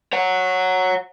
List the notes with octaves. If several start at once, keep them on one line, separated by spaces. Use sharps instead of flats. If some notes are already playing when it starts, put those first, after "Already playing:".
C#5 F#5